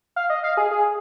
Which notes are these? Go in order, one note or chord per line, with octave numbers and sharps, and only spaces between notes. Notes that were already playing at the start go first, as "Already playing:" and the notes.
F5
D#5
F5
G#4
G#4